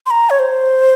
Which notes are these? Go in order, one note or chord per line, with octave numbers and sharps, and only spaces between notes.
C6
A#5
C#5
C5